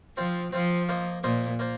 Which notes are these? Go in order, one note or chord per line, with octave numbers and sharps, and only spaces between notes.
F3 C4 F4 C5 F5
F3 C4 F4 C5 F5
A#3 F4 C5 D#5
A#2 A#3 F4 C5 D#5
A#3 F4 C5